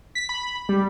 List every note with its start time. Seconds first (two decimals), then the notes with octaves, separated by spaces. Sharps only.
0.15 B6
0.29 B5
0.69 G3